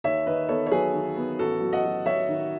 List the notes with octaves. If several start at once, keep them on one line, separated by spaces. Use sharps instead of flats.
D#2 C#5 E5
D#3 B4 D#5
B3 A4 C#5
C#5
F#3 G#4 B4
D#3
B3
A1 F#4 A4
F#3
D#5 F#5
F#3
F#3 C#5 E5
D#3